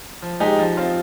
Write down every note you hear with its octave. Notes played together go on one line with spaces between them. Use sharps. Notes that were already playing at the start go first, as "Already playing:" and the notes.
F3
G#3 D#4 G4
F3
C4 F4